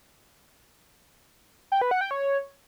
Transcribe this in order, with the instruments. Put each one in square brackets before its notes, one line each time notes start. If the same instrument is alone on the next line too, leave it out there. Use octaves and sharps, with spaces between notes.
[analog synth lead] G5
B4
F#5
G5
C#5